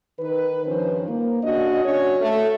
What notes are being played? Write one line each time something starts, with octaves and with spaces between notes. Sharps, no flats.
D#3 B4
G2 D#3 F3 C#4 C5
A#3
C#3 D4 F#4 D#5
C#4 D4 F#4 C#5
A3